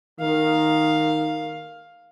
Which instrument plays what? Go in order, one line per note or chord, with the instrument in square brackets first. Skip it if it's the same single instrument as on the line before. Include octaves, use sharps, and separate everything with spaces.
[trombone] D#3 [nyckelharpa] F5